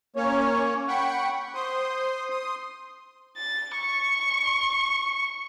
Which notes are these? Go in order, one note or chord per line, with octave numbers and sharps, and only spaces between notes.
A#3 C#4 C#5
F#5 G5 B5 C#6
C5 C6 D#6
C6 D#6
A6
C#6